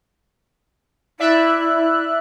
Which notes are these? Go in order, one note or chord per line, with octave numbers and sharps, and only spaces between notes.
E4 D5 E5 F#6